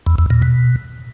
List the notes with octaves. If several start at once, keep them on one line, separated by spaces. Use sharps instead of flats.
E2
E2
A#2
B2